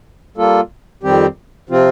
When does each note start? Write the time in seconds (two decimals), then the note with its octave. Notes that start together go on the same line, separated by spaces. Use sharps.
0.37 G3 A#3 F4 A4
1.03 F2 D#3 G3 C4 G4
1.69 C3 F3 C4 F4